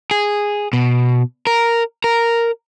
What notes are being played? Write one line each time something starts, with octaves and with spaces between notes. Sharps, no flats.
G#4
B2
A#4
A#4